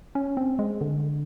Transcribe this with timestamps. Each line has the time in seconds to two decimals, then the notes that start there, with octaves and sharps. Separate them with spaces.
0.15 C#4
0.37 C4
0.59 G#3
0.81 D3